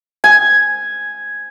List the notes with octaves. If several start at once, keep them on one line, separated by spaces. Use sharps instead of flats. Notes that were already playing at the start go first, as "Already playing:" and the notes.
G#5